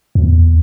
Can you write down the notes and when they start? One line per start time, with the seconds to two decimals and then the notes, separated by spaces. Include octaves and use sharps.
0.15 E2